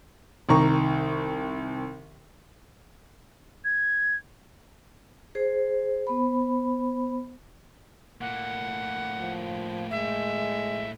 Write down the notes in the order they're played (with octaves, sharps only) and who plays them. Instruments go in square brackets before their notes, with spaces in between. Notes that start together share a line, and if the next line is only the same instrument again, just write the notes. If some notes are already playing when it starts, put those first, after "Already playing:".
[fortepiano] C2 D#3 A#5 C#6
[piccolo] G#6
[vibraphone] G#4 C5
B3 C5 B5
[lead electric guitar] A2 A#3 [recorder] F#5
[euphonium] F3
[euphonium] G#3 [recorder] E5